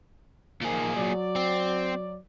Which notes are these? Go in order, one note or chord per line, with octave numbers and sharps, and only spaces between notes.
A#2 D#3 F3 A#3 G#4
F#3 D5
C4